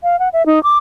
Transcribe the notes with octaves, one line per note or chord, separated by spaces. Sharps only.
F5
F#5
E5
D#4
D6